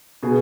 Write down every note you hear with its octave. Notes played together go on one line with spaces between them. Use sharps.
B2 G#4